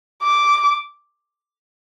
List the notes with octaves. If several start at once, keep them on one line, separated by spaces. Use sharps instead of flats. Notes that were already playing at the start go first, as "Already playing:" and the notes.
D6